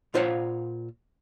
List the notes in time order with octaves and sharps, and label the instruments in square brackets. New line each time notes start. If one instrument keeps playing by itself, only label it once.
[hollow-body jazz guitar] A#2 F4 C5 C#5 F5 F#5